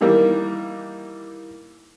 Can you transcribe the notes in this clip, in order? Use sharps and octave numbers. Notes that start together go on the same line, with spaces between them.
D#3 E3 G3 A#3